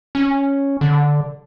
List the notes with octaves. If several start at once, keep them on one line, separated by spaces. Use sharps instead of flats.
C#4
D3